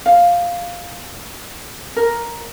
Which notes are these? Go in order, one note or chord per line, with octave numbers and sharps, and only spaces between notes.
F5
A#4